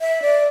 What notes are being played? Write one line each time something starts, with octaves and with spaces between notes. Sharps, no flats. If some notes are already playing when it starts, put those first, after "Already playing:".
E5
D5